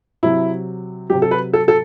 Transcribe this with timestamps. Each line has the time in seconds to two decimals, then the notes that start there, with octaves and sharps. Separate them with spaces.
0.23 C3 F#3 E4
1.10 C3 F#3 G4
1.22 A4
1.31 B4
1.53 A4
1.68 A4